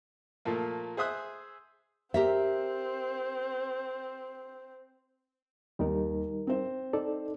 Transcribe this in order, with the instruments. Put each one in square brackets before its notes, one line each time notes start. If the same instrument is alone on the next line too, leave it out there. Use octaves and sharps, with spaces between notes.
[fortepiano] A#2 F3 A3 A#3
G#4 C5 E5 D#6 F#6
[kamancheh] C4 [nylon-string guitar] G4 A#4 E5
[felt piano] D#2 [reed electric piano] G3 D#4 A#4
[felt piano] C4 C5
[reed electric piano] D#4 A4 D5